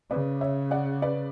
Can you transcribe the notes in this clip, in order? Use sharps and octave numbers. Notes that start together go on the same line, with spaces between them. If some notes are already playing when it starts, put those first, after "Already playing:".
C#3 B4 D5
C#5 E5
D5 F#5
B4 D5